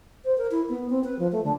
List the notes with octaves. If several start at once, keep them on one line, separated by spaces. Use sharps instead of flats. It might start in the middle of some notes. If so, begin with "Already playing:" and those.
C5
A#4
E4
B3
C4
B4
F3
A3
D3